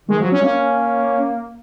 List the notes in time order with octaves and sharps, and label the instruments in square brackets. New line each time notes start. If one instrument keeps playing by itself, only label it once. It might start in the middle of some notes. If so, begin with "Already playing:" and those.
[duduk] D#3 [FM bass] G#3
[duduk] F3 [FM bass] F#3
[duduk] F#3 [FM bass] C#4
[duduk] A#3 [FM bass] C#4